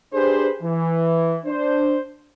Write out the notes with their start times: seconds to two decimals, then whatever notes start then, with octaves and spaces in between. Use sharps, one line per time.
0.14 D4 G4 G#4 B4 C5
0.63 E3
1.46 D4 C5